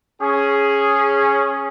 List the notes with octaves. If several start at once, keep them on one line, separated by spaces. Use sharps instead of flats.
C#4 G#4